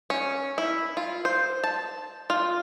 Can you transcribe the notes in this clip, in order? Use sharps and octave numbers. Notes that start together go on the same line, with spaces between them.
C#4
E4
F4
C5
A5
F4